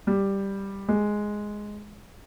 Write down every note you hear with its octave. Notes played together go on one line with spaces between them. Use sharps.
G3
G#3